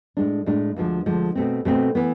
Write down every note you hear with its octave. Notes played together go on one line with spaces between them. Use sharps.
A2 G#3 D4
A2 G#3 D4
D2 D3 F3 G#3
D2 D3 F3 G#3
B2 A3 C4
B2 A3 C4
E3 B3